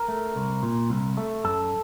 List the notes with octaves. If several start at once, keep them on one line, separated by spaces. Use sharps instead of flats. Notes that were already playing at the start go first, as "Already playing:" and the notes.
Already playing: A#4
A3
C2
A#2
C2
A3
F#2 A4